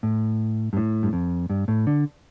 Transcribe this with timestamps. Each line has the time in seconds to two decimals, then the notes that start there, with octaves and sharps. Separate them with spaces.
0.03 A2
0.73 G2
0.77 A2
1.03 G2
1.13 F2
1.50 G2
1.68 A2
1.87 D3